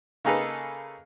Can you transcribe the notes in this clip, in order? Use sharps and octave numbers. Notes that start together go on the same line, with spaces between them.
C#3 A#3 D#4 G#4 A4 B4